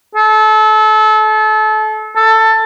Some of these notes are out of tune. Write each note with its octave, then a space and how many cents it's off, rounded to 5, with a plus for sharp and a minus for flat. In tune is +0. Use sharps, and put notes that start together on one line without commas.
A4 -30
A4 +15